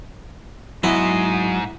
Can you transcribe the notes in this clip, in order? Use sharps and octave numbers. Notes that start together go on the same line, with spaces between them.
G#2 F#3 B3 E4 D#5